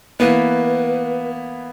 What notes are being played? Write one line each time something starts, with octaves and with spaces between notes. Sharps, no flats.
E3 A#3 B3 B4